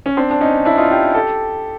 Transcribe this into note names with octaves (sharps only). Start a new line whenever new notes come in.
C#4
C4 D4
D4
C#4 D#4
D4 E4
D#4 F4
F4 G4
G4 A4